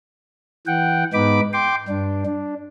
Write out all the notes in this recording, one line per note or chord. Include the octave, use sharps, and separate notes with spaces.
E3 F#5 G5
G#2 B3 D#4 B5 D6
G5 C6 D6
G2 D4
D4